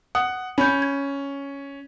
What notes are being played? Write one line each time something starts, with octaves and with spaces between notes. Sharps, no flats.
F#5 D#6
C#4 B5 G6
G#6